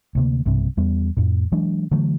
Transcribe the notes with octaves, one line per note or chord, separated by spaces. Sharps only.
D2 C3 A#3
B1 G2 C3
E2 G3 B3
F2 A2
E3 F#3 G#3 D4
D3 E3 F#3 A3